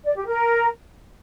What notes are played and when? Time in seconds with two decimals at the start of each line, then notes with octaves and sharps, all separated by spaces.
0.04 D5
0.15 G4
0.26 A#4